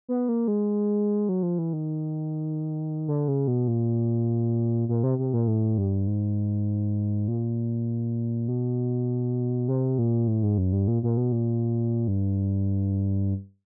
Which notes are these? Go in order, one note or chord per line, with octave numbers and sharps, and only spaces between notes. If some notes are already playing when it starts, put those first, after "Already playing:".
B3
A#3
G#3
F#3
F3
E3
D#3
D3
C#3
B2
A#2
A#2
C3
C3
A#2
A2
G2
G#2
A#2
B2
C3
A#2
A2
G#2
F#2
G2
A#2
A#2
B2
A#2
G2